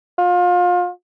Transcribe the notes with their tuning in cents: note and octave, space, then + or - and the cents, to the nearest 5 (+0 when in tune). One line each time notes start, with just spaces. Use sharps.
F4 +30